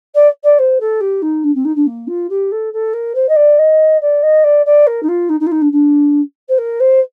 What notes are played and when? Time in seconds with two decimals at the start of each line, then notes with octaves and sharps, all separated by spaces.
0.14 D5
0.43 D5
0.58 C5
0.80 A4
1.00 G4
1.22 D#4
1.43 D4
1.55 C4
1.64 D#4
1.75 D4
1.86 A#3
2.07 F4
2.29 G4
2.51 A4
2.73 A4
2.93 A#4
3.14 C5
3.28 D#5
3.36 D5
3.58 D#5
4.01 D5
4.22 D#5
4.43 D5
4.65 D5
4.86 A#4
5.02 D#4
5.08 F4
5.29 D#4
5.40 D#4
5.46 F4
5.51 D#4
5.61 D4
5.72 D4
6.48 C5
6.58 A#4
6.80 C5